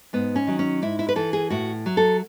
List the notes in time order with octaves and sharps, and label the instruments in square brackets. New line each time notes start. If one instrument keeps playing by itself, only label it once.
[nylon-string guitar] G#2 B3
C#4
D#3 F#3
C#4
G#2 E4
E4
B4
E3 A4
G#4
A2 F#4
F#3
A4